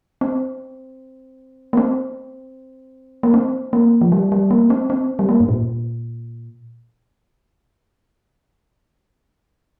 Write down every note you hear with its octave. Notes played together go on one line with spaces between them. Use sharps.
C4
A#3
C4
A#3
C4
A#3
F3
G3
G3
A#3
C4
C4
G3
A#3
G2
A#2